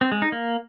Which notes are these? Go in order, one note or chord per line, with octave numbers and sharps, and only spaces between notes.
C4
G#3
D#4
A#3